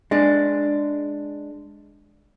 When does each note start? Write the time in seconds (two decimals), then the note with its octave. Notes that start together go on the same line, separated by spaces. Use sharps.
0.11 G#3 D4